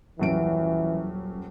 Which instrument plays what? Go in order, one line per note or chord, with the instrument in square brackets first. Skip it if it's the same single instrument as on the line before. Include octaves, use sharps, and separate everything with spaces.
[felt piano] D#1 F#2 D7 [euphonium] E3